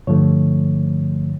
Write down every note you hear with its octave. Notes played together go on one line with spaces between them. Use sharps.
G2 D3 F3 A3 C#5